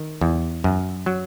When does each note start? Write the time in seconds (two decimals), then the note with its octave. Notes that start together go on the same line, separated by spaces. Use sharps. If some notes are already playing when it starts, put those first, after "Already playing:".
Already playing: D#3
0.21 E2
0.64 F#2
1.06 F#3